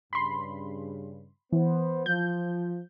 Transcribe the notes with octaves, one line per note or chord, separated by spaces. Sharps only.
G2 C#3 B5 C6
E3 B3 C5
F3 G6